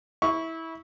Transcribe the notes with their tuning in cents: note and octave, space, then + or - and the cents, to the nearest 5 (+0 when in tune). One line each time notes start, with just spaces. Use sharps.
E4 -20 C#6 +5